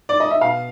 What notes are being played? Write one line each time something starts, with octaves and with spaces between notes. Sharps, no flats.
D5
D#5
E5
B2 F5